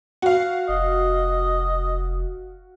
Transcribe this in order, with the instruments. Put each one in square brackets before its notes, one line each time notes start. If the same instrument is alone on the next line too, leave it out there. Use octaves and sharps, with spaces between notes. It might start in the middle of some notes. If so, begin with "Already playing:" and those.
[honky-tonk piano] F#4 F5
[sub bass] F1 [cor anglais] D#5